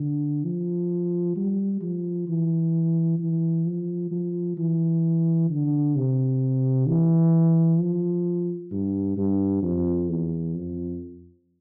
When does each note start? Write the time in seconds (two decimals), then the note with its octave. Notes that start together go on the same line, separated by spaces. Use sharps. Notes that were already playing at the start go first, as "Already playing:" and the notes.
Already playing: D3
0.44 F3
1.36 G3
1.82 F3
2.28 E3
3.19 E3
3.66 F3
4.11 F3
4.58 E3
5.50 D3
5.96 C3
6.87 E3
7.79 F3
8.71 G2
9.17 G2
9.62 F2
10.09 E2
10.55 F2